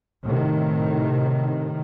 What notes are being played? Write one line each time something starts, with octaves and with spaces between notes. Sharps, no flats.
A2 C3 D#3